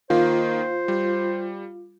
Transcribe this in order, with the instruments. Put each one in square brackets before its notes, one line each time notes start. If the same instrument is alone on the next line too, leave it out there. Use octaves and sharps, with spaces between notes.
[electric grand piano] D#3 A#3 [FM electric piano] F4 [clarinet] C5
[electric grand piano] G3